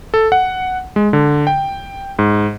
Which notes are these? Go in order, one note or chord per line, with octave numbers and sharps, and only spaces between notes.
A4
F#5
G#3
D3
G5
G#2